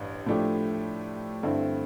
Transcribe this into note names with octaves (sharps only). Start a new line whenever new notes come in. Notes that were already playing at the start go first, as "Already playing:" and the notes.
Already playing: A1 G2
A2 F3 A3 D4 G4
G2 D3 A3 C4 E4